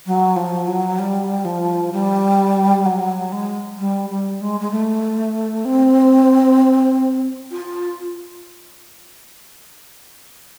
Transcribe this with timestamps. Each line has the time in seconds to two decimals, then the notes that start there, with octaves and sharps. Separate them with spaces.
0.06 F#3
0.36 F3
0.67 F#3
0.99 G3
1.45 F3
1.93 G3
2.86 F#3
3.32 G#3
3.79 G3
4.10 G3
4.41 G#3
4.61 G#3
4.71 A3
5.65 C4
7.51 F4